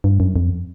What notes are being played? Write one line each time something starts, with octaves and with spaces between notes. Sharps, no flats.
G2
F#2
F2